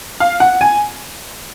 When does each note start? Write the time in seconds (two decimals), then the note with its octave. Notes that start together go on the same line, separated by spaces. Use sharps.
0.20 F5
0.40 F#5
0.61 G#5